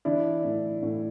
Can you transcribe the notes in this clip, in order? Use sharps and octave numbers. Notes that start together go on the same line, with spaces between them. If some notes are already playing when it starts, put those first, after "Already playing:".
E3 D4 E4
A2
A2